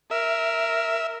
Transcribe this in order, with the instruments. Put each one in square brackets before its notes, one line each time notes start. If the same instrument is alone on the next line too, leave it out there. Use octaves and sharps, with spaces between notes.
[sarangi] A#4 [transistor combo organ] E5